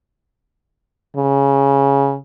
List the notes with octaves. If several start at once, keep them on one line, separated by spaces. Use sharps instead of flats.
C#3